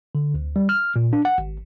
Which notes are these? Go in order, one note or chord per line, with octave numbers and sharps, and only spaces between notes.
D3
D2
G3
F6
A#2
D4
F#5
G#1